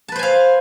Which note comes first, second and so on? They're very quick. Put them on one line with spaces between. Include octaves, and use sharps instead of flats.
A5 B4 C5 G#5 F5